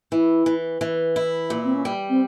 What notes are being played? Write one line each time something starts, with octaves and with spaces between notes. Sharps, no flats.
E3 E4
E3
E3
E4
A#2
C4
C#4
G3
C4